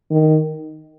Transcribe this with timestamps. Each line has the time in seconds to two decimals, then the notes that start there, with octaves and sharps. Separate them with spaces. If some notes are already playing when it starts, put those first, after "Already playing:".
0.11 D#3